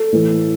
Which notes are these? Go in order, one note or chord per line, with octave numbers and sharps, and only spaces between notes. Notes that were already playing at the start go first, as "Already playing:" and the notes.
Already playing: A4
A2 E3